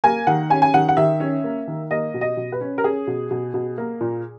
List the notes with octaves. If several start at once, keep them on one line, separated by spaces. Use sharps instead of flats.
A#3 G#5
D#3 F#5
C#4 G#5
G#5
D#3 F#5
F#5
D#3 E5
C#4
A#3
D#3
A#3 D#5
B2
D#5
B2
B4
C#4
A#4
C#4 G#4
B2
B2
B2
A#3
A#2